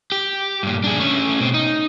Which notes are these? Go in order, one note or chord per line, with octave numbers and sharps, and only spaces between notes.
G4
G2 A#2
D4 G#4
A3 C#4
B2 C4
D#4